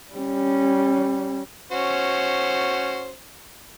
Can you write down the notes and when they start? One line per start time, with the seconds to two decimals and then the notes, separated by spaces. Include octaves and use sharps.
0.14 G3 C#4
1.72 C#4 F#4 C5